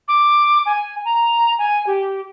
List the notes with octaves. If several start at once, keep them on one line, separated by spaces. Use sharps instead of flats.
D6
G#5
A#5
G#5
G4